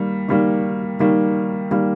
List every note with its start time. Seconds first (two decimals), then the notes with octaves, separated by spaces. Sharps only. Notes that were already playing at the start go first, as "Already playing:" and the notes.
Already playing: D#3 G3 A#3
0.28 D#3 G3 A#3
1.00 D#3 G3 A#3
1.71 D#3 G3 A#3